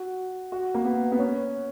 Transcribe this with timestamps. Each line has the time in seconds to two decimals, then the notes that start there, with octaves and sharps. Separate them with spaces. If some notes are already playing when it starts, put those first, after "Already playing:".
Already playing: F#4
0.52 F#4
0.74 A#3
0.85 B3
1.12 B3
1.19 C#4